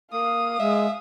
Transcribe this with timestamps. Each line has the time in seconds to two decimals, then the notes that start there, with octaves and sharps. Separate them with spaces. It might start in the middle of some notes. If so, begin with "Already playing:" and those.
0.13 A#3 F5 D#6
0.60 G#3 E5